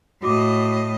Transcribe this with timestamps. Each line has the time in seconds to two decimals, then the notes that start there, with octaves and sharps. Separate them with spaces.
0.23 A2 F#4 D#5 D6